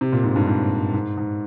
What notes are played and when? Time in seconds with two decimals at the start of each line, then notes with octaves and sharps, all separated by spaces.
0.01 C3
0.12 A#2
0.23 G#2
0.36 G2
0.47 G#2
0.94 G#2
1.17 G#2